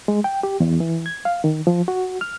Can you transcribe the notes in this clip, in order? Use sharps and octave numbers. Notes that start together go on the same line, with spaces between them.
G#3
G5
G4
E2
E3
G#6
F5
D#3
F3
F#4
F6